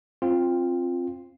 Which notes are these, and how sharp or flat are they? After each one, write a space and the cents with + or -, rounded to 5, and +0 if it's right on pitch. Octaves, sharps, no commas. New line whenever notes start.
C4 +15 F4 +0